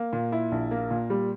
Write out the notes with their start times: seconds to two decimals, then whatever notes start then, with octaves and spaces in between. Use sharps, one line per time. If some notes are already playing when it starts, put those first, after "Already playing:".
Already playing: A#3
0.13 A#2
0.32 E4
0.52 A#1
0.71 A#3
0.91 A#2
1.10 G3